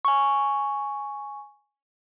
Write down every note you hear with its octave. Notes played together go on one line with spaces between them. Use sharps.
G#5 C#6